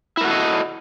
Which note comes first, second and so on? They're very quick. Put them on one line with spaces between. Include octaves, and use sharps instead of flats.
E4 A#4 F#4 A4 D#5